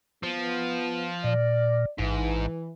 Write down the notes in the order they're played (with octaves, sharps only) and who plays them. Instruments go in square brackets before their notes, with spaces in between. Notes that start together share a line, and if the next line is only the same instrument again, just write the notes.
[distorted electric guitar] F3 [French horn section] B3
[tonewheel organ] A#2 [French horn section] D5
[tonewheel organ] A1 [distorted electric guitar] G#2 [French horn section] E3